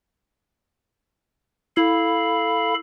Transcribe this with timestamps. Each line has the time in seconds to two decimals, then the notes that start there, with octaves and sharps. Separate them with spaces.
1.77 E4 A4 F5 B5